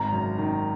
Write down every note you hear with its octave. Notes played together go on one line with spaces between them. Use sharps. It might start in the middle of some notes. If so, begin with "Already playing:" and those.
Already playing: G#1 A#5
F#2
D#3